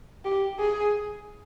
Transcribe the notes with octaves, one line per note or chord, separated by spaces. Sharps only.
G4
G#4